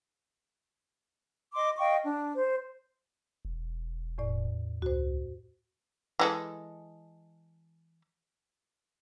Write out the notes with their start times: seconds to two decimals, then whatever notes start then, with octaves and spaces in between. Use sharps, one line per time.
1.54 D#5 C6 D6
1.78 D#5 F5 G5 C#6
2.05 D4
2.34 C5
3.45 E1
4.18 E2 A2 D5
4.82 C#2 F#4 C5
6.19 E3 G#3 A4